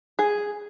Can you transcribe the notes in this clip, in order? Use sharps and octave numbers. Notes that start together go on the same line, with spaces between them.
G#4